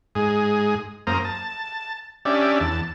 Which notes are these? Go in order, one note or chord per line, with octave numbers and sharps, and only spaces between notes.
G#2 G#4
F#2 A#3 C5 A#5 D#6
A5
C#4 D4 G4 D5 E5
E2 A5